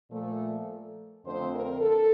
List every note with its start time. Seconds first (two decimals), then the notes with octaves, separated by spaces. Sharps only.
0.11 A#2 F3 A3
1.25 F2 D3 A3 C4 C5
1.54 A#4
1.82 A4